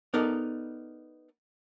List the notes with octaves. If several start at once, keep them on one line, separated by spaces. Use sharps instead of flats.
B3 D#4 A4 A#4 D5